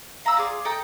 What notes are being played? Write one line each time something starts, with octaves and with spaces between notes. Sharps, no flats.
F5 A#5 B5 E6
F4 G#4 D5
A4 D#5 G5 A#5